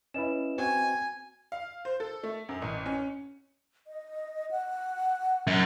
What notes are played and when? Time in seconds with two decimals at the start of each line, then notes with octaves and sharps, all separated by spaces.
0.14 C#4 E4 B4 D#5 E7
0.58 C4 F#4 G#5
1.52 F5
1.85 C5
2.00 A4
2.23 A3
2.49 F#2
2.62 A1
2.86 C#4
3.87 D#5
4.51 F#5
5.47 F#2